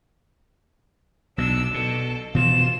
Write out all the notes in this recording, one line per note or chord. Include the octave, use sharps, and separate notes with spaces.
B1 B2 D4 E6
B2 A4
B2 E3 F3 F4 E7